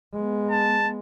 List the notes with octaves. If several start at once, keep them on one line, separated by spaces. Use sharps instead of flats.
G#3 B3
A5